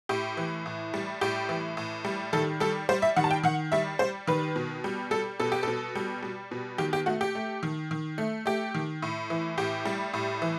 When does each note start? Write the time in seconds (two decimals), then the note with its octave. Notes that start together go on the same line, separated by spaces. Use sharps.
0.09 A2 G4
0.37 E3
0.66 A2
0.94 G3
1.21 A2 G4
1.49 E3
1.77 A2
2.05 G3
2.33 D#3 A4
2.60 G3 A4
2.89 G3 C5
3.02 E5
3.16 D#3 F#5
3.24 A5
3.31 G5
3.44 D#3 F#5
3.72 G3 E5
3.99 G3 C5
4.27 D#3 B4
4.56 B2
4.84 G3
5.11 G3 A4
5.40 B2 A4
5.52 G4
5.63 B2 A4
5.95 G3
6.22 G3
6.51 B2
6.78 D#3 G4
6.93 G4
7.06 A3 F#4
7.21 G4
7.35 A3
7.63 D#3
7.91 D#3
8.18 A3
8.46 A3 G4
8.75 D#3
9.02 A2
9.30 E3
9.58 A2 G4
9.85 G3
10.14 A2
10.42 E3